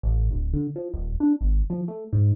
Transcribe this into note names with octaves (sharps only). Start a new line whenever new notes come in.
A1
D1
D3
F3
D#1
D4
G#1
F3
A3
G#2